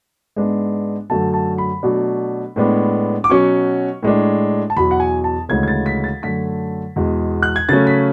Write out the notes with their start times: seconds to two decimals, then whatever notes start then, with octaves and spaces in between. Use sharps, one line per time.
0.36 G#2 G#3 B3 D4
1.10 F#2 D3 F#3 A3 A5
1.34 A5
1.58 B5
1.83 B2 F#3 A3 D4
2.56 A2 G#3 B3 D4
3.24 D6
3.29 B2 F#3 C#4 C#6
4.03 A2 G#3 D4
4.70 A5
4.76 E2 B2 F#3 B5
4.91 F#5
5.00 G#5
5.24 A5
5.49 D2 C#3 E3 G#3 C#4 G#6
5.63 G#6
5.68 A6
5.86 B6
6.04 A6
6.22 F#2 D3 A3 B6
6.96 E2 B2 G#3
7.42 F#6
7.56 G#6
7.69 C#3 F#3 A3 C#4 A6
7.87 B6